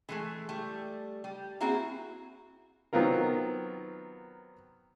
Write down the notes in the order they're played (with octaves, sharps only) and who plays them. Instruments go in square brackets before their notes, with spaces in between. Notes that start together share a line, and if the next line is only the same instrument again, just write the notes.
[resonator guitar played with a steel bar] E3 G#3 A3
G3 A3
G3
A#3 C4 E4 F#4 G#4
[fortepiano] D#3 F#3 B3 C4 F4 A#4